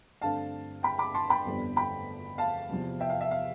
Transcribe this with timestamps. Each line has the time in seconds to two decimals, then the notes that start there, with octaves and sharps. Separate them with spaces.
0.21 G2 D3 A3 C4 F5 A5
0.83 G5 B5
0.99 B5 D6
1.14 A5 C6
1.30 G5 B5
1.45 G1 F2 D3 G3 B3
1.76 G5 B5
2.38 F5 A5
2.69 E2 C3 F3
3.00 E5 G5
3.10 F5
3.21 E5
3.31 F5